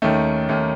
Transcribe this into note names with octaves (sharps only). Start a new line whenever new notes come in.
D#2 D#3 A3 C#4
D#2 D#3 A3 C#4